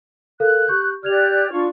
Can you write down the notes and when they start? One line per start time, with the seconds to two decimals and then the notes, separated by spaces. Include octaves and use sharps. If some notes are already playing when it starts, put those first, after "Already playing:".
0.40 A4 A#4 F5 F#6
0.68 G4 C#6 G6
1.03 G4 D5 F6 F#6 G#6 F7
1.52 D4 F4 C#6